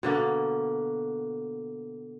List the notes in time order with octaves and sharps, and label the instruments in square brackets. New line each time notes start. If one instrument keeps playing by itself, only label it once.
[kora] B2 D3 A#3